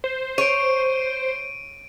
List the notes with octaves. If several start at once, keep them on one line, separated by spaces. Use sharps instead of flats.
C5
C#5 D7 D#7